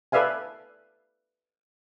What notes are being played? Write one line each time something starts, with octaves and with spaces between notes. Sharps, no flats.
A4 B4 D5 E5 F5 G#5